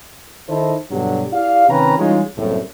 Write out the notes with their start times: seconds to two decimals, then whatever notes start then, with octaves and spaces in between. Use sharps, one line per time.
0.49 D#3 D#4 E4 A4 C5 D#5
0.91 G2 B2 D3 F#3 G4
1.32 E4 G4 D5 F5
1.69 C3 D#3 C#4 B4 G5 A#5
1.98 E3 G3 G#3 C#4 D#4 F4
2.36 F#1 C2 A2